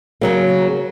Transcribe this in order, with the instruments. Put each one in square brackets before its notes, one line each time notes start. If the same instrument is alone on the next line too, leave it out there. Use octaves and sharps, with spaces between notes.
[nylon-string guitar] C#3 F#3 A#3